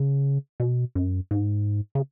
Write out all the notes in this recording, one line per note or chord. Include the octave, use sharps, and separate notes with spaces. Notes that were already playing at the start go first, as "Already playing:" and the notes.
Already playing: C#3
B2
F#2
G#2
C#3